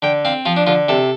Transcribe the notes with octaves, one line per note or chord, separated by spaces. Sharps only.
D3 G5
C4 F5
F3 F4
D4
D3 F4
C3 A4